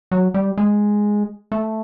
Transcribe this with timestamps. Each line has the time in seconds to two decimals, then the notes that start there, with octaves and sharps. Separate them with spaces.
0.11 F#3
0.34 G3
0.58 G#3
1.52 A3